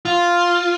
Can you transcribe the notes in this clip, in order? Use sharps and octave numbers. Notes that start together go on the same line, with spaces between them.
F4